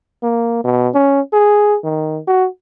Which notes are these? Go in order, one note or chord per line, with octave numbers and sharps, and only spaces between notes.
A#3
B2
C#4
G#4
D#3
F#4